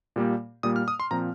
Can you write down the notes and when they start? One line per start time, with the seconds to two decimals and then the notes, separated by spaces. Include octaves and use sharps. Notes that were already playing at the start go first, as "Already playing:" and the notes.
0.16 A#2 G3 A#3
0.63 A#2 G3 A#3 D#6
0.76 F6
0.88 D#6
1.00 C6
1.11 A#2 F3 C4 A#5